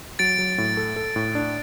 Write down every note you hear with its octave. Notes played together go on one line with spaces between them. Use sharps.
F#3 A6 D7
F#3
A2
A4
A4
A2
D4